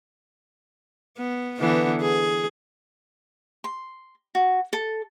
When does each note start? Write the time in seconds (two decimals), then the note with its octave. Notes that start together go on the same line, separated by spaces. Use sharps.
1.17 B3
1.59 D3 E3 B3
2.01 G#4
3.64 C6
4.35 F#4
4.73 A4